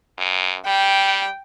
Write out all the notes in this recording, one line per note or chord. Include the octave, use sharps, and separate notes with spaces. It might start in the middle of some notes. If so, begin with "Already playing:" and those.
F#2
G3 G5